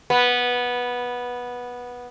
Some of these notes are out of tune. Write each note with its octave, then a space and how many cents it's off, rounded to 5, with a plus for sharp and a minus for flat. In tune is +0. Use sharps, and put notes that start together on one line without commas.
B3 -10